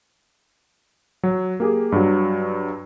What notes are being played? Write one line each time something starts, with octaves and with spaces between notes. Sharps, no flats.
F#3
A#3 G4 G#4
G2 F#3